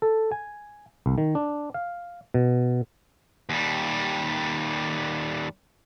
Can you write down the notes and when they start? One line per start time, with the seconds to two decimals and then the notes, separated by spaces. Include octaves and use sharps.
0.02 A4
0.32 G#5
1.06 C2
1.18 D#3
1.35 D4
1.74 F5
2.34 B2
3.49 D#2 G3